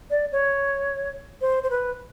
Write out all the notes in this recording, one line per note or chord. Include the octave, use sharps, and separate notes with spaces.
D5
C#5
C5
C5
B4